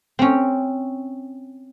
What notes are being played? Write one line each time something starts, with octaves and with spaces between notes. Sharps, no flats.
C4 C#4